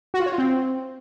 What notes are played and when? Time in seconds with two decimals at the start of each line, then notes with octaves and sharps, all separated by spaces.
0.14 F#4
0.20 F4
0.26 C#5
0.32 F4
0.38 C4